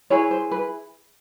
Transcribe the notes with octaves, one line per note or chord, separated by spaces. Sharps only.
E4 G#4 B4 C#5
C5
B4